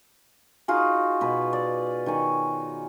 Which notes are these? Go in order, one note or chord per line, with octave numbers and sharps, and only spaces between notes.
D#4 F4 F#4 G#4
B2 B4
D5
D#3 C#5 G#5